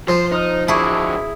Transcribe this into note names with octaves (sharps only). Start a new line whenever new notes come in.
F3 C5
D#4 C5 D#6 F6
D3 F#3 E4 G#4 A5 C#6 D6